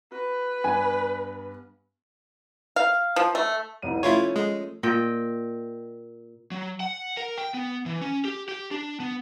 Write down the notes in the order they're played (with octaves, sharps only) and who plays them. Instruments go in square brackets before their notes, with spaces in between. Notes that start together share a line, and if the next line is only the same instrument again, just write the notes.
[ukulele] F#4 [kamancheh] B4
[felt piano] G2 G3 B3 [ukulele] G#5
[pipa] F5
F3
A3
[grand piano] F1 C2 D#7
[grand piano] F3 A3 C#4 [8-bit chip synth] E4 F4 C#5
[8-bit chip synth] G#3
[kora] A#2 D#5 G5
[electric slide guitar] F#3
F#5
A#4
G5
B3
E3
C#4
G4
G4
D4
B3